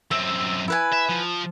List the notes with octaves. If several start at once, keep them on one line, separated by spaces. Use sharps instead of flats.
F#2 C4 E5
E4 B4 G#5
E5
F3